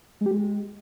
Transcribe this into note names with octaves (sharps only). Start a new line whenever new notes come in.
G#3
G4
G#3